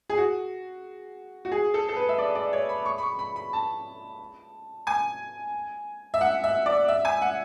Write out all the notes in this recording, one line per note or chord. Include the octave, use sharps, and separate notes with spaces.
G#4
F#4
F#4
G#4
A4
A4
B4
E5
D5
D5
C#5
B5
C#6
B5
C#6
B5
B5
A5
G#5
E5
F#5
E5
D5
E5
G#5
F#5